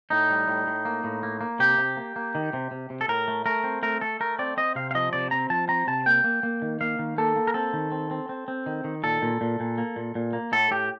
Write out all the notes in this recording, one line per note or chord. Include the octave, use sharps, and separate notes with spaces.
A2 D#4
G3
A2
A2
A#3
A2
A#3
A#3
C3 G4
C3
A#3
A#3
D#3
C3
C3
C3
A4
A2 A#4
A3
A3 A#4
C4
A3 A#4
A3 A4
A3 A#4
C4 D5
C4 D#5
C3 F5
F5
F3 D#5
C3 D5
C4 A#5
F3 A5
C4 A#5
C3 A5
A#3 G5
A#3
A#3
D#3
A#3 F5
D#3
A#3 A4
A#3
A#4
C4 A4
D#3
C4
C4
C4
C4
D#3
D#3
A#2 A4
A#2
A#2
A#2
A#3
A#2
A#2
A#3
A2 A4
A2 G4